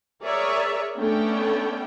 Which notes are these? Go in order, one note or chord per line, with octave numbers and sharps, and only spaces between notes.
G#4 A#4 C#5 D5 E5
A3 B3 C#4 D4 C#5 G5